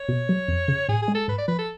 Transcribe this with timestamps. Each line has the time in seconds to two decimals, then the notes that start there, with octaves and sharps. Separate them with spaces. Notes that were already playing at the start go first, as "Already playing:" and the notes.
Already playing: C#5
0.09 B2
0.29 F#3
0.48 F2
0.68 C#3
0.89 A2 G#4
1.02 G#4
1.08 G#3
1.15 A4
1.28 G#2 B4
1.38 D5
1.48 F3 B4
1.59 A4